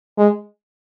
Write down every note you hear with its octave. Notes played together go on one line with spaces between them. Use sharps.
G#3